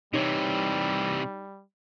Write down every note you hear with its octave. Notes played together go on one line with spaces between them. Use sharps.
C3 E3 G3 D#4 C#5